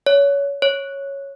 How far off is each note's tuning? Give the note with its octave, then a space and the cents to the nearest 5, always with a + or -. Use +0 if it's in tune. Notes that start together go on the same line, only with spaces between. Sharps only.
C#5 +25
C#5 -5